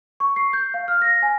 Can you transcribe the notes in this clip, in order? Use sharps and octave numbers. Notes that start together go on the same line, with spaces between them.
C#6
C7
G6
F5
F6
A#6
G#5